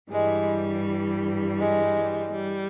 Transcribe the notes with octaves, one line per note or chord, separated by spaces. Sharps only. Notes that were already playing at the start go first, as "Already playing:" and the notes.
G2 E3 G3 G#3
G#3
G3